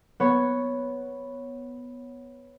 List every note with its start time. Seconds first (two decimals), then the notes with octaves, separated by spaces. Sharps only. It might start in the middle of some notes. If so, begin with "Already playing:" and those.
0.20 B3 C#5